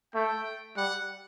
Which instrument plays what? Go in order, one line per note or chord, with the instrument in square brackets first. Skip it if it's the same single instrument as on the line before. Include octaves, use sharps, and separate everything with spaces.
[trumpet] A3 [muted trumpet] G5
[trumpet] G3 [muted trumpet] F#5